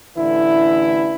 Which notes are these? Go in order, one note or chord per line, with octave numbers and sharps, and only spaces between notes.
A1 D3 E3 E4